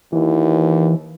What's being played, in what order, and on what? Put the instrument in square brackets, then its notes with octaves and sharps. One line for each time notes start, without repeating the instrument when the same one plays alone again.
[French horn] D#2 [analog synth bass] E3